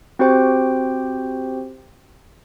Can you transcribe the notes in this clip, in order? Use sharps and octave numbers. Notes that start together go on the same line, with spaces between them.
C4 F#4 G4 C5 G5